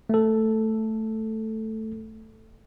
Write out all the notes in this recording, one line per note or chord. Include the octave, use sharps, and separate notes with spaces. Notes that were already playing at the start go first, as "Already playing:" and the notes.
A3 A4